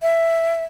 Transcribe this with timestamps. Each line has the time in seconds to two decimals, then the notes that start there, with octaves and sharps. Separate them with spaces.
0.02 E5